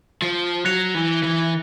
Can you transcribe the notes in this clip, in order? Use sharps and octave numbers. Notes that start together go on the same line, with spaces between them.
F3
F#3 F#6 A#6 C#7 F7
E3
E3